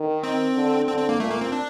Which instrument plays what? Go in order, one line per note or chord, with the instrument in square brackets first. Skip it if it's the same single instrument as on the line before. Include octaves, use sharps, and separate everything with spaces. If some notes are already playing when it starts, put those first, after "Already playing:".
Already playing: [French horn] D#3
[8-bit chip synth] C4
[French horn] D3
[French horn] D3 [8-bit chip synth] C4
[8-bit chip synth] C4
A#3
[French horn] A#2 [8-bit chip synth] A3
[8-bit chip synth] A#3
C4
D4